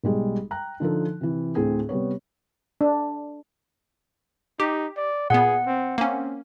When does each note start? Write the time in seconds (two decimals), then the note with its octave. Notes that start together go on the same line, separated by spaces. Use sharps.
0.04 B1 G3 G#3
0.51 G5 A#5 F#6
0.80 D3 F3 D#4 A4
1.21 C3 E3
1.55 D2 A2 C4 G#4
1.89 C3 G3 B3 C#5
2.81 D4
4.60 D#4 G4
4.97 D5
5.30 A#2 B3 G#4 F#5
5.67 C4
5.98 A#3 C4 C#4